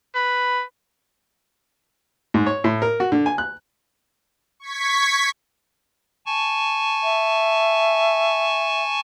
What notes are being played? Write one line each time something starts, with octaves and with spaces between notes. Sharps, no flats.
B4
G#2
C#5
A2
A#4
F#4
D3
G#5
F#6
C#6 G#6 B6
G#5 A5 C#6
E5